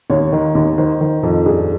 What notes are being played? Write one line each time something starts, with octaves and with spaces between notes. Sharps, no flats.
D#2 C#5
D#3
D#2
D#3 C5
D#3
F2
G2 G#4